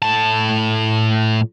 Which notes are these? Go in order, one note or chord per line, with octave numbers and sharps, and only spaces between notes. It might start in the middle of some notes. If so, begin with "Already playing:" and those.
A2 A5